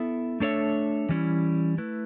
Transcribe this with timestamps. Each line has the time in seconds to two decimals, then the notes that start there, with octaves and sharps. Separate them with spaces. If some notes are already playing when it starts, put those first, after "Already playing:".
Already playing: B3 E4 A4 E5
0.40 A3 D4 A4 C#5 E5
1.09 E3 G3 C#4 E4
1.78 A3 E4 B4